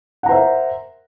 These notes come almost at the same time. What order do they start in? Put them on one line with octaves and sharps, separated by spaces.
F#5 A#5 C5 E5 A#4